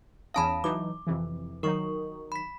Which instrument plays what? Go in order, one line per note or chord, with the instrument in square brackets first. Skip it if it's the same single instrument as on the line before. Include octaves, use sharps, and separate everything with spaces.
[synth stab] E2 C#4 D#6 [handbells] F5 A5 B5
[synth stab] E3 F#3 D#4 [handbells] D6
[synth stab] F2 C3 E3
[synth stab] D#3 F#3 D#4 [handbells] A#4 C#6
[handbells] B5 B6